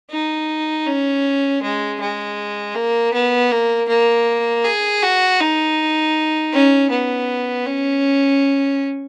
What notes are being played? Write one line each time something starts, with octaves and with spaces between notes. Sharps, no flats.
D#4
C#4
G#3
G#3
A#3
B3
A#3
A#3
G#4
F#4
D#4
C#4
B3
C#4